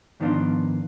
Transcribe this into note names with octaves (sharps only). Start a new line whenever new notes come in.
G#2 D#3 F3 B3 D4 F4